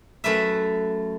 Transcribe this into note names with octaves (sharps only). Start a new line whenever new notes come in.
F#2 A3 B4 E5